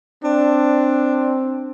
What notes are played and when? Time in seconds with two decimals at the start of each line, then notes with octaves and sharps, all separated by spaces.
0.24 C4 D4